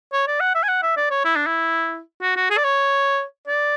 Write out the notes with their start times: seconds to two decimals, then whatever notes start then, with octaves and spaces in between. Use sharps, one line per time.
0.13 C#5
0.27 D5
0.40 F#5
0.55 E5
0.63 G#5
0.68 F#5
0.82 E5
0.97 D5
1.10 C#5
1.24 E4
1.36 D4
1.46 E4
2.22 F#4
2.36 F#4
2.50 G#4
2.57 D5
2.64 C#5
3.47 D5